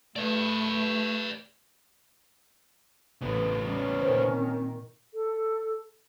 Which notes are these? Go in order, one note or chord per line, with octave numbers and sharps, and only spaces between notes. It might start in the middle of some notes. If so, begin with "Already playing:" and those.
A3 B4 D5
A1 C#3 B3
G3 C#4
A#2 D#3 C5
C4
A4